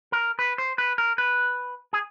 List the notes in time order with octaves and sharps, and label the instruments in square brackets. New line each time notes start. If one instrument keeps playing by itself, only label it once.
[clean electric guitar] A#4
B4
C5
B4
A#4
B4
G#4